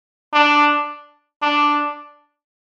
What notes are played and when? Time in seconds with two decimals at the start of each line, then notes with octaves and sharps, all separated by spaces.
0.34 D4
1.42 D4